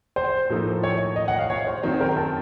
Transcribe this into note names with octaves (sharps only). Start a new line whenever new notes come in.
C5
A2 F3 A#3 D#4 A4
C#5
D#5
F#5
F5
C#5
C5
F#2 D#3 F#3 C4 C5
A#4
A5